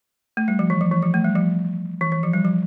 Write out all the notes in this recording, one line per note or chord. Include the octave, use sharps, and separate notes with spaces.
A3
G3
F3
E3
F3
E3
F3
A3
G3
F3
E3
E3
F3
G3
F3